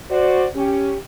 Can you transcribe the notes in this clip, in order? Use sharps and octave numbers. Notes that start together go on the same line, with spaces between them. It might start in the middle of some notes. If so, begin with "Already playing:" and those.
F#4 C5 D5
C#4 G4